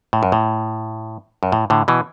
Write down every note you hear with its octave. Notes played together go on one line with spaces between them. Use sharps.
A2
F#2
A2
F#2
A2
A2 D3
B2 E3